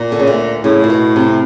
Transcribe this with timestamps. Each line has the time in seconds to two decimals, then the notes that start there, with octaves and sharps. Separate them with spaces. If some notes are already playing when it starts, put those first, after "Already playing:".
Already playing: A#2
0.12 D3
0.19 C#3
0.27 D2 D3
0.64 A2 C#3
0.84 A#2
0.90 B2
1.16 C3